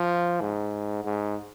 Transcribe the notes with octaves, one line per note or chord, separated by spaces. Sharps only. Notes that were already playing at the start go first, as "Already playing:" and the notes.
Already playing: F3
G#2
G#2